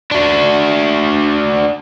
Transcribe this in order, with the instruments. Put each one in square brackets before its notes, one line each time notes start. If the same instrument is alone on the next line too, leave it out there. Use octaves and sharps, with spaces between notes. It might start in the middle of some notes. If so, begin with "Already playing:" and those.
[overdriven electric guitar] D4 F#4